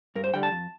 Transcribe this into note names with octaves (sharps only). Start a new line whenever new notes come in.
G2 A#4
C5
D3 G3 G5
A5
F2